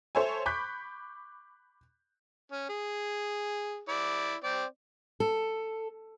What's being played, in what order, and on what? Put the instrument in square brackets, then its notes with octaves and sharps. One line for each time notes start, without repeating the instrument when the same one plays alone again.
[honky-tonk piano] A4 C5 C#5 E5 G#5
B5 C#6 D6 F#6 G6 B6
[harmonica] C#4
G#4
E4 D5
C4 D5
[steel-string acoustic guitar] A4